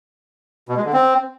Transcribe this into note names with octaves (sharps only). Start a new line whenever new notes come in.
B2
G#3
D3
C4